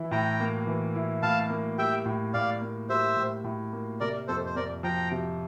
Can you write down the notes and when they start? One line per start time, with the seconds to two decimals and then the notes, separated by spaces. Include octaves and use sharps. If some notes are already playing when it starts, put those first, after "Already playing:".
Already playing: E3 E4
0.11 A2 G5 A#5
0.40 A#3
0.67 E3
0.95 E4
1.22 A2 F5 A5
1.50 A#3
1.78 G3 E5 G5
2.05 A2
2.34 A2 D5 F5
2.61 A#3
2.89 G3 C5 E5
3.17 A2
3.44 A2
3.73 A#3
4.00 C3 A#4 D5
4.28 F2 A4 C5
4.46 C5
4.55 F2 A#4 D5
4.83 F3 G5 A#5
5.11 C3